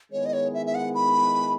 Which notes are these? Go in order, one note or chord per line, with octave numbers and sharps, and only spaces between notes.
D#3 G#3 B3 E4 G#4 C#5
D#5
C#5
E5
E5
F#5
B5